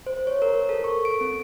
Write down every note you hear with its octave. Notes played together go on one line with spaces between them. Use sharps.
C5
C#5
A#4
A4
C#6
D7
C4